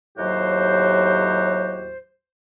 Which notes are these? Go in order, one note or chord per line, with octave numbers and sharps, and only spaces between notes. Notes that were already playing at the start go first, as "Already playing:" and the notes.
D#2 A2 F#3 F#4 G4 C5